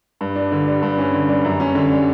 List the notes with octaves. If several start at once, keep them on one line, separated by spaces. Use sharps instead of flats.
G2
D4
D3
G3
G2
C#4
D3
G3
F#2
C#4
D3
G3